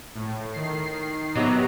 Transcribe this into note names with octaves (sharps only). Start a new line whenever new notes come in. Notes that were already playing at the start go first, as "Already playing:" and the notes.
A2
D#3 C7
C3 F#3 B3 D#4 A#5